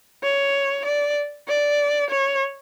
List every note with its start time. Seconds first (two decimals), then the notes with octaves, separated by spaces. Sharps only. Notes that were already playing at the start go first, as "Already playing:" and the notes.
0.23 C#5
0.85 D5
1.48 D5
2.10 C#5